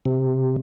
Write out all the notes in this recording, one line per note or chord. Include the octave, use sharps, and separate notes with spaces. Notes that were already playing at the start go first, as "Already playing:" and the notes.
C3